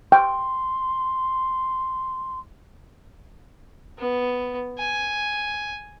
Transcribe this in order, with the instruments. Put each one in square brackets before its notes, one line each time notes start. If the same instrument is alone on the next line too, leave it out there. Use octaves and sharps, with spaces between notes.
[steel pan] G5 [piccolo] C6
[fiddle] B3
G#5